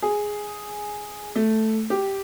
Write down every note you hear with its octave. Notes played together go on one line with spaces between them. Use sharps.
G#4
A3
G4